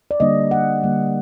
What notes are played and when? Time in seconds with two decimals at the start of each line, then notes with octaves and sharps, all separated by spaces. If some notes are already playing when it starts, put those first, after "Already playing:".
0.11 D5
0.20 D3 G3 A#3 D4 D#5
0.51 F#5
0.83 D3 G3 A#3